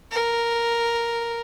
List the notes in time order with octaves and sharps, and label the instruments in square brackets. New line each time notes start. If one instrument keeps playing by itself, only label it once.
[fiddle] A#4